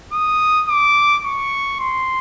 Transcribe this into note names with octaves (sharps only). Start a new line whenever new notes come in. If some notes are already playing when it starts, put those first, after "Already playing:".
D#6
D6
C#6
C6